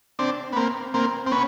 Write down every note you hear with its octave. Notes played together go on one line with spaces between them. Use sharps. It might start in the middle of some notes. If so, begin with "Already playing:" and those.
C4 D4
B3
A#3 C4
A#3 C4
C4
B3 C#4